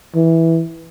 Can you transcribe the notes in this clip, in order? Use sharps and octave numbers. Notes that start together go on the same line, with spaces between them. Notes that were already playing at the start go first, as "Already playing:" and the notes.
E3